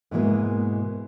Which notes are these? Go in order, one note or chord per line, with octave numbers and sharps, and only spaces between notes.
G#2 B2 E3 G3 G#3 A#3